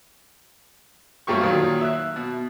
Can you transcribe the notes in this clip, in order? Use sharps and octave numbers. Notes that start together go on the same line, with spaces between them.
G2 F#3 A3 A#3 G4 C#6
A#2 D#3 F#3
E5 F#6
B2